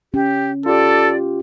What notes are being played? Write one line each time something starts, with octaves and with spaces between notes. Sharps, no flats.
C#4 G4
F4 G4 A4 D5